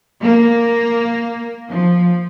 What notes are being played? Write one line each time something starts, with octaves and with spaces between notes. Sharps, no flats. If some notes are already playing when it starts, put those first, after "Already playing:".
A#3
F3